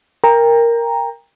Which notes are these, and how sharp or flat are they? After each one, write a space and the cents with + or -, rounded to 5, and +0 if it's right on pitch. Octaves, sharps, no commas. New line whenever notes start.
A#4 +0 G5 +30 A#5 +0